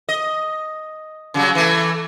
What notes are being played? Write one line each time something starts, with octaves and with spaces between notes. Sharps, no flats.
D#5
C#3 F#3 G3
E3 A3